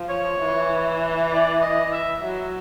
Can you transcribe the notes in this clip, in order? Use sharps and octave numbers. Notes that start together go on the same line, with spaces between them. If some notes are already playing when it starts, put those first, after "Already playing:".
Already playing: F3
C#5
E3
D5
D#5
E5
F#3